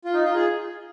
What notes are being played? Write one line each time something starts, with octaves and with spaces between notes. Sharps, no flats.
F4
D#4
F4
G#4